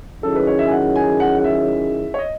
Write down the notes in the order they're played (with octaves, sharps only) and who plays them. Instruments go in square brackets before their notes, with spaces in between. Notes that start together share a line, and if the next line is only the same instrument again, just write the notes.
[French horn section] D#3 F#3 C#4 E4 G#4 [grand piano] A4
[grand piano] B4
C#5
E5
G#5
F#5
G#5
F#5
F#5
E5
C#5
D#5